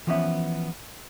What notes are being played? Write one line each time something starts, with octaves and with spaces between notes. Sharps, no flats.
E3 F3 B3 C#4 C5 E5